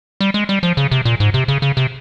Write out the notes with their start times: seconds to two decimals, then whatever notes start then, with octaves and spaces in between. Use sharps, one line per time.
0.21 G3
0.34 G#3
0.49 G3
0.63 F3
0.77 C#3
0.91 C3
1.05 A#2
1.20 G#2
1.34 C3
1.48 C#3
1.62 C#3
1.77 C3